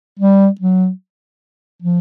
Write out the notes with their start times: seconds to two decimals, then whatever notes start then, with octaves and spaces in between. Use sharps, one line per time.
0.19 G3
0.61 F#3
1.83 F3